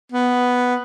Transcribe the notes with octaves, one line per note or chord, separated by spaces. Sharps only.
B3